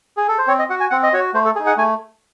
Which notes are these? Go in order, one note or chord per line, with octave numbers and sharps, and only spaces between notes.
G#4
A4
C5
C4 C#5
D#5
F#4 F#5
G#5
C4 F#5
D#5
F#4 C#5
A3 C5
A4
D#4 G#4
F#5
A3 G#5